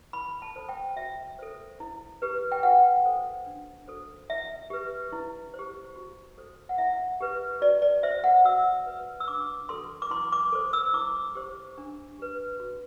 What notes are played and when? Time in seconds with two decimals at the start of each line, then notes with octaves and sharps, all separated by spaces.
0.13 E4 B5
0.42 A5
0.56 A4 C5
0.69 G5
0.96 F#4 E5
1.39 A4 C5
1.80 E4
2.22 G4 B4
2.52 G5
2.63 F#4 F#5
3.05 A4 C5
3.46 D4
3.88 F#4 A4 C5
4.29 E4 E5
4.70 G4 B4
5.12 E4
5.54 C5
5.59 G4
5.96 F#4
6.38 A4 C5
6.69 F#5
6.78 E4 E5
7.20 G4 B4
7.62 F#4 D5
7.82 D5
8.03 C5 E5
8.24 F#5
8.45 F#4 E6
8.86 B4
9.20 E6
9.28 D4 D6
9.69 F#4 A4 C6
10.02 D6
10.10 E4 C6
10.32 D6
10.52 A4 C5
10.73 E6
10.94 E4 D6
11.35 G4 C5
11.78 D4
12.19 G4 B4
12.60 F#4